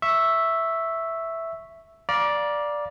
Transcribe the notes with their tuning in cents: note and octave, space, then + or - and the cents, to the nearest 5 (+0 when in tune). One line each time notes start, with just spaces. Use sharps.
E5 +0 C#6 +0
D5 +0 F5 +0 A#5 +35